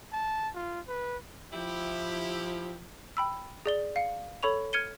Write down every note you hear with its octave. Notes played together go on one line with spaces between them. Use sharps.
A5
F4
B4
F3 E4 G4
G5 B5 E6
G#4 D5 G7
F5 C#7
A4 C#5 B5 C#6 F7
F6 G#6 C#7 D#7 G7